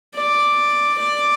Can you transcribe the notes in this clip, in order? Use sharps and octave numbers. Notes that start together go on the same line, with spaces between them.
D5
D5